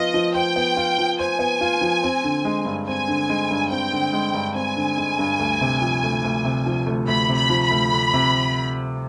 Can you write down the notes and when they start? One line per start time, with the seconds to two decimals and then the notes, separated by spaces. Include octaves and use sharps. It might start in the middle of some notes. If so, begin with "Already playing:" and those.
Already playing: F3 B3 F4 D#5
0.14 F3
0.35 C5 G5
0.56 B3
0.77 F4
0.98 F3
1.19 C5 G#5
1.39 B3
1.61 F4
1.81 F3
2.03 C4
2.24 D3
2.45 G#3
2.65 G2
2.87 C4 G#5
3.08 D3
3.30 G#3
3.51 G2
3.71 C4 G5
3.92 D3
4.13 G#3
4.34 G2
4.55 C4 G#5
4.76 D3
4.97 G#3
5.19 G2
5.39 D2
5.61 C3
5.81 F3
6.03 D2
6.24 D2
6.45 C3
6.66 F3
6.86 D2
7.07 D2 B5
7.29 C3
7.35 B5
7.50 F3
7.64 B5
7.71 D2
7.93 D2
8.13 C3